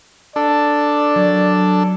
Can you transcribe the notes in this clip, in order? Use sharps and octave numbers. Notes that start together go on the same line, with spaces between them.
D4 A4 D5
F#3